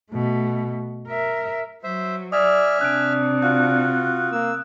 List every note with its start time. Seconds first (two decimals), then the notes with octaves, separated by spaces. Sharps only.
0.12 B2 A3
1.08 A#4 E5
1.84 F#3 C5 E5
2.32 D5 E5 G#5 D#6 F6
2.81 C3 D4 F#6 D7
3.42 F4 F#4 F#6
4.32 A#3 E6